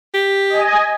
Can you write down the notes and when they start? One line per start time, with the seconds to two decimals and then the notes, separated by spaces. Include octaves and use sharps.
0.14 G4
0.50 D#5 G#5